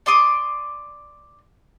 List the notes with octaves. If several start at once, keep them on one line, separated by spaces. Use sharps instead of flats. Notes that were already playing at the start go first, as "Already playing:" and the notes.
D5 C6 D6 D#6